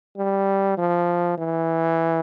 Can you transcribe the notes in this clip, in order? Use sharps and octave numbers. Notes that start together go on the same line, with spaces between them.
G3
F3
E3